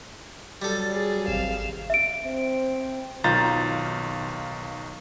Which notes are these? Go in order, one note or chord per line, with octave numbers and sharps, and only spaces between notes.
F#3 G3 A4
G#4
G#1 C3 F5 E7
E5 D7
C4
B1 D#3 F4 A#5 G6 A6